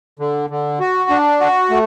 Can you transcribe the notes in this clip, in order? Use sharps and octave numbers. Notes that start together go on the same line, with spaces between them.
D3
D3
F#4
D4
F#4
A3